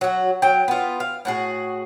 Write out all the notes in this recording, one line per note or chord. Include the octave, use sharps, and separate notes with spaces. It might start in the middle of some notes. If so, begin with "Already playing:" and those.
F#3 F#4
F#3 G5
B3 F4
F5
A2 F#4 G#4